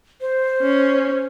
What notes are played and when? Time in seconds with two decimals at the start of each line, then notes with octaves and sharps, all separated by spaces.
0.21 C5
0.62 C#4